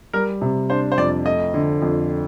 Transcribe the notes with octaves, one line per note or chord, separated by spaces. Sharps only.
G3 A#4
C3
D4 C5
C5
F2 D5
A3 D#5
D3
F2